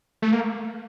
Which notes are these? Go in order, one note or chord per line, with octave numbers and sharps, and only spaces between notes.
A3
A#3